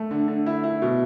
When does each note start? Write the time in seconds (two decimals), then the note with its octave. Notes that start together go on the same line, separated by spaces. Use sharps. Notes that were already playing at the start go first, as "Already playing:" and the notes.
Already playing: A3
0.11 D3
0.28 D3
0.46 E4
0.64 E4
0.82 B2